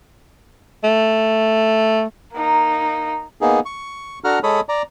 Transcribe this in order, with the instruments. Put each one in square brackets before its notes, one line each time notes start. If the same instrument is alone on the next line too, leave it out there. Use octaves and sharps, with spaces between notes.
[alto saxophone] A3
[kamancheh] A#3 D#4
[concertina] A#3 B3 D#4 G#4
C#6
D4 F#4 A4 F#5 A#5 F6
G#3 A4 C#5 B5 D#6
D5 A#5